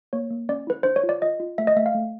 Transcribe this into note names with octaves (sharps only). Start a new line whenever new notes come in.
A#3 C#5
A#3
C#4 D5
E4 B4
D4 C5
C#5
F4
D5
F4 D#5
F4
A3 E5
D#5
A3 E5
F5
A3